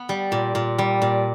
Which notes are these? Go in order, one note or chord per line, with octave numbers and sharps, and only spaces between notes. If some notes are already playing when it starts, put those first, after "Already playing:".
Already playing: B3
G3
A#2
A#2
G3
A#2